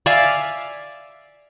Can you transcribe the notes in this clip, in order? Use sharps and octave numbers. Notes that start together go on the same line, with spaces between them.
D5 E5 F5 G#5